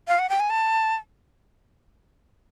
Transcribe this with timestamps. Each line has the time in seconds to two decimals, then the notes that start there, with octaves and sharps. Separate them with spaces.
0.08 F5
0.19 F#5
0.30 G5
0.40 G#5
0.50 A5